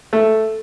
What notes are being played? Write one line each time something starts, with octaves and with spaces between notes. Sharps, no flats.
A3